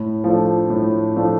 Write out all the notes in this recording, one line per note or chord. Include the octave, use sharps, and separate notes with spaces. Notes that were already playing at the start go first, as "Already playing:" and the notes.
Already playing: A2
F3 A3 D4
A2
F3 A3 D4